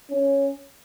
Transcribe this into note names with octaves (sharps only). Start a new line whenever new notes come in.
C#4